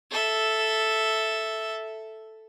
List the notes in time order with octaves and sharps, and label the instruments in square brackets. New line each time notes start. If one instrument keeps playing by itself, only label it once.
[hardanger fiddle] A4 E5